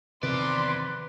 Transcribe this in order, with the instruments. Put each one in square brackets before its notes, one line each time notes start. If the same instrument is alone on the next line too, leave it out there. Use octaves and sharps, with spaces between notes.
[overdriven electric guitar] E2 D5 [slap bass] C3 D#3 F3 [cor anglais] B4 [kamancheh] C6 D6